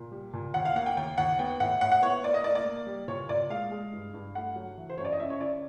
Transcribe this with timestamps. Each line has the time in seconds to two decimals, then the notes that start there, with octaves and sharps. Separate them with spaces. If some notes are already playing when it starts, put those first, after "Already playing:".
Already playing: A#2
0.12 G3
0.33 A#2
0.54 D#2 F#5
0.65 F5
0.75 A#3 F#5
0.86 G5
0.97 D#2 G5
1.18 D#2 F#5
1.39 B3 G5
1.60 A2 F#5
1.81 A2 F#5
1.92 F#5
2.02 B3 C#5
2.23 A#3 D5
2.34 D#5
2.44 A#3 D5
2.55 D5
2.65 A#3
2.87 G3
3.08 A#2 C#5
3.29 A#2 D5
3.50 G#3 F5
3.71 G#3
3.93 G2
4.14 G2
4.35 A3 F#5
4.56 F#3
4.77 E3
4.90 C5
4.98 F#2 C#5
5.05 D5
5.12 D#5
5.20 C#3 E5
5.30 C#5
5.40 C#3 D5